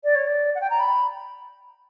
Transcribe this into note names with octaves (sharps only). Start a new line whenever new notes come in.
D5
C#5
D5
F#5
G5
A#5
B5